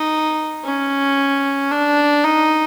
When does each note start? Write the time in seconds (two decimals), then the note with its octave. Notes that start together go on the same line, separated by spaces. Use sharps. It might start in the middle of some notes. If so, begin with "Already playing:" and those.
Already playing: D#4
0.64 C#4
1.71 D4
2.24 D#4